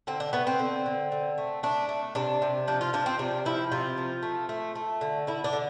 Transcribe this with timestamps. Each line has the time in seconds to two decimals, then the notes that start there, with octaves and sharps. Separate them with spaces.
0.07 D3 C4
0.20 D4
0.33 A3 B3
0.47 C4
0.59 D3
0.86 D3
1.12 D3
1.38 A3
1.63 A3 D4
1.89 A3
2.15 C3 D4
2.42 C3
2.68 F3 D4
2.81 F4
2.93 F3 D4
3.06 C4
3.19 C3 D4
3.45 F3 E4
3.72 C3 F4
3.97 F3
4.23 A3
4.49 A3
4.75 A3
5.01 D3
5.27 D3 E4
5.44 D4
5.53 D3